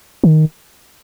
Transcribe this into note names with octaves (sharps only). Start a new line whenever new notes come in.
D#3